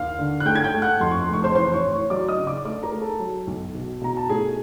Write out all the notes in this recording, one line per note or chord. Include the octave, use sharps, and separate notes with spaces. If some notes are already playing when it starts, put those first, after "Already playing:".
Already playing: D#2 F5 F6
D3
F#6
A3 G5 G6
G#6
G5 G6
A3
F#5 F#6
F2 C6
C#6
C6
F1
C#6
C5 C6
E3 C5 C6
C6
C#5 C#6
A2
C#5 C#6
F#3 D5 D6
D#5 D#6
C#3
D5 D6
A3 D5 D6
A#4 A#5
A3
A4 A5
F#3
B1
B2
B2 A#5
A5
A3 G#4 G#5